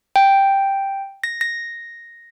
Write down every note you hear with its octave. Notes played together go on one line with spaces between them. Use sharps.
G5
A#6
A#6